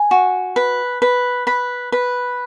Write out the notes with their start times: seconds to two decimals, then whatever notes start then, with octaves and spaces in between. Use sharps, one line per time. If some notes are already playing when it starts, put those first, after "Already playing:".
Already playing: G#5
0.11 F#4
0.56 B4
1.02 B4
1.47 B4 B5
1.92 B4